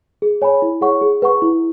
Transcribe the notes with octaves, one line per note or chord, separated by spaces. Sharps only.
G#4
C#5 G#5 B5
E4
G#4 C#5 F#5 C#6
G#4
B4 F#5 C#6
E4